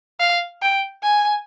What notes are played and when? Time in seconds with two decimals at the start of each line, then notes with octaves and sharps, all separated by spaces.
0.20 F5
0.62 G5
1.03 G#5